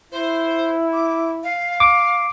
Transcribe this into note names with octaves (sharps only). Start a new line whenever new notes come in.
E4 C5
D6
F5
D6